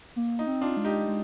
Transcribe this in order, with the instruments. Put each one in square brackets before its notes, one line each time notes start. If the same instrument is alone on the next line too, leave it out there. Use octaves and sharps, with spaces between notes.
[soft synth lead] A#3
[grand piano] D#4
[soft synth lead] C4
[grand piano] D4 F4
[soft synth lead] G#3
[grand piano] D#4 G4
[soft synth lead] G#3